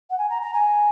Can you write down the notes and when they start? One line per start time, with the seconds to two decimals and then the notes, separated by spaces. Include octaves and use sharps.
0.10 F#5
0.18 G#5
0.29 A#5
0.42 A#5
0.53 G#5